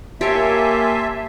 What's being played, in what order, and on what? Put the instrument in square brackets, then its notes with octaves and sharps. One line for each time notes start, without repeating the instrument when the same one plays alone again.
[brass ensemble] A#3 [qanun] G4 C#5 [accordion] E5 [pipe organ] G#5 A5 C6